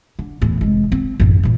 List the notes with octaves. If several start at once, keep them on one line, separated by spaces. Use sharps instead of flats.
D3
E2 A2
F1 G#3
C4
A1 F#2
A#2 E3